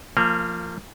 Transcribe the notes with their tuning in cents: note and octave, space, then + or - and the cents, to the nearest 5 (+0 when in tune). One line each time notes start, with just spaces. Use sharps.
F3 -5 A#3 -35